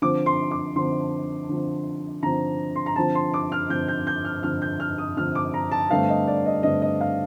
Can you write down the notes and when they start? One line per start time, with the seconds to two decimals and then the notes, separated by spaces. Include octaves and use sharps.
0.02 D3 F3 C4 D6
0.26 C6
0.51 D6
0.76 D3 F3 C4 C6
1.49 D3 F3 C4
2.23 D3 F3 C4 A#5
2.76 C6
2.86 A#5
2.96 D3 F3 C4 A5
3.15 C6
3.34 D6
3.52 F6
3.69 D3 F3 C4 G6
3.88 G6
4.07 G6
4.25 F6
4.43 D3 F3 C4 F6
4.62 G6
4.80 F6
4.98 D#6
5.17 D3 F3 C4 F6
5.35 D6
5.54 A#5
5.71 A5
5.90 G2 D3 A3 C4 F5
6.09 D#5
6.28 D5
6.46 D#5
6.63 G2 D3 A3 C4 D#5
6.82 D#5
7.01 F5